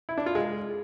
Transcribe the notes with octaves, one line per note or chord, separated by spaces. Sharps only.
E4
D4
F4
G#3